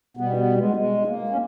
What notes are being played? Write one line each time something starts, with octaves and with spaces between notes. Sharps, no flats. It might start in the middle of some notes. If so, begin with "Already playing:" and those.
B2 G3 B3
B3
G#3
G#3
A#3
C#4